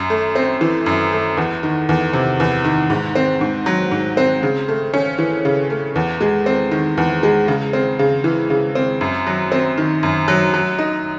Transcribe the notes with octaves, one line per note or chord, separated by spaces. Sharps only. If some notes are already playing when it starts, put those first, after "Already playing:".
Already playing: F#2
A3
C4
E3
F#2
A3
E2
D#3
E2
C3
E2
D#3
G#2
C4
G#2
F#3
G#2
C4
C#3
A3
C#4
E3
C#3
A3
E2
G#3
C4
D#3
E2
G#3
C#3
C4
C#3
E3
C#3
C4
F#2
F#3
C4
D#3
F#2
F#3
F#3
D#4